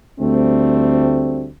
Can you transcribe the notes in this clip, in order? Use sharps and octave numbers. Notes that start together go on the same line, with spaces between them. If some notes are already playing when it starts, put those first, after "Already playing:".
D2 G3 A3 C4